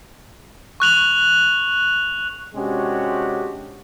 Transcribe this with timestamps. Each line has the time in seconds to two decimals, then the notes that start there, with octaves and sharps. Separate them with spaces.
0.80 C#6 F#6 F7 F#7
2.55 C3 G#3 C#4 D4 F#4 G4